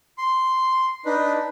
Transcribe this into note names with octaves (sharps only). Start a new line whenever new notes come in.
C6
D4 D#4 B4